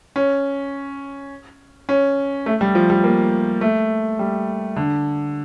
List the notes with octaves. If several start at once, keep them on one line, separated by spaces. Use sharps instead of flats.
C#4
C#4
A3
G3
F3
G3
A#3
A3
G3
D3